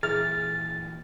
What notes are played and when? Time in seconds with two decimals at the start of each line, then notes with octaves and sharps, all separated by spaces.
0.03 A#2 E3 G#4 E5 F6 A6